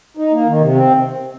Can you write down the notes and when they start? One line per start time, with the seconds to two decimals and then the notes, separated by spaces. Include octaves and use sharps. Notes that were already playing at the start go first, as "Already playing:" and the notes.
0.17 D#4
0.32 A#3
0.47 D#3
0.61 C3
0.75 C4